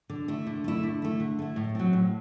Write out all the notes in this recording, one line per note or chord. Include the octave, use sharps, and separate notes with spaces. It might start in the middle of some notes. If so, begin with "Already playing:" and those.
D3
A3 E4
D3
A3 E4
D3
A3 E4
D3
A3 E4
A2
F#3 C4
A2